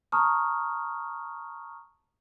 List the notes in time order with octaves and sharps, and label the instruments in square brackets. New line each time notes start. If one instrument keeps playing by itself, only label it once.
[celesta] A5 A#5 C#6 D#6 F6